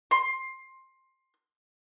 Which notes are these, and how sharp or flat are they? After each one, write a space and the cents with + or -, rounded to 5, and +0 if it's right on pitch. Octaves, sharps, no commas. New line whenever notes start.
C6 +15